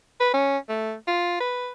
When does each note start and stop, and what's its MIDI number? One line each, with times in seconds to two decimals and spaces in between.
0.20 0.30 71
0.34 0.58 61
0.69 0.94 57
1.07 1.36 65
1.40 1.72 71